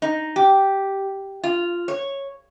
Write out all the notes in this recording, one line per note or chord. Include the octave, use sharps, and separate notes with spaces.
D#4
G4
F4
C#5